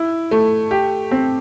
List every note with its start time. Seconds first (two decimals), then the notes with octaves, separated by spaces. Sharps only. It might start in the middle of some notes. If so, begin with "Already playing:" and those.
Already playing: E4
0.31 A3
0.71 G4
1.11 C4